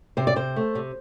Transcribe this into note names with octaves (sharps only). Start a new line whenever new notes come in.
C3 C5
D5
C3 C5
A3
C3